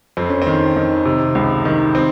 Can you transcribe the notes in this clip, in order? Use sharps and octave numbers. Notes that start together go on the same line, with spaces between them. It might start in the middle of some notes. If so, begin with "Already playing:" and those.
F2 C4
C#4
C4
D#3
D#3
C3
C#2
D#3
C4